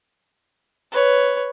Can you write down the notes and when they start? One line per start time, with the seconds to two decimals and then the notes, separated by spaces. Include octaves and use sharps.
0.92 B4 C#5